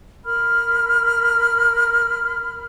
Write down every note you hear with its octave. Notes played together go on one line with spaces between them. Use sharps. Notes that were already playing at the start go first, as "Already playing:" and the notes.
A#4 B5 F6